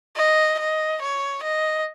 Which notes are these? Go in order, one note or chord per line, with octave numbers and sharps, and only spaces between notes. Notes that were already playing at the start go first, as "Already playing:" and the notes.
D#5
D#5
C#5
D#5